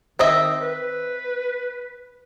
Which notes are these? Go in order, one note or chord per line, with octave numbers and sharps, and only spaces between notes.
D#3 C4 D#5 E5
B4